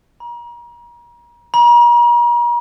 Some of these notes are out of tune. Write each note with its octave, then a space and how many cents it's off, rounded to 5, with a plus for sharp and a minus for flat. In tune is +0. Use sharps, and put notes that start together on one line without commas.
A#5 +35
A#5 +40